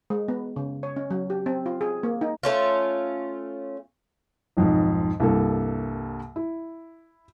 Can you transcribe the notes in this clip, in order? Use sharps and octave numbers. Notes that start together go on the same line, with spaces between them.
G#3
B3
C#3
C#5
C#4
F#3
G4
C4
F4
G#4
A#3
D#4
A3 C#4 F4
B1 F2 G#2
C2 G2 A#3 A4
E4